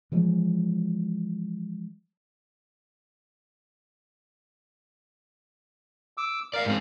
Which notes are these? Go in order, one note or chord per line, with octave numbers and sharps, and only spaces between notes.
E3 F3 G#3
D6 E6
A#4 D5 F5
G#2 C4